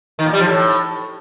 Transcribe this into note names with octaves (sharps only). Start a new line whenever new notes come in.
D#3
A#2
G3
F3
A2